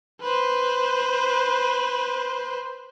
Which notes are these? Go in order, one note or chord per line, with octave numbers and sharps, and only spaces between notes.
B4 C5